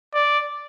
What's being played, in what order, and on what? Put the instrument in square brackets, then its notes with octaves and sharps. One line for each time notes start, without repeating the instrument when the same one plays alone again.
[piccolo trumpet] D5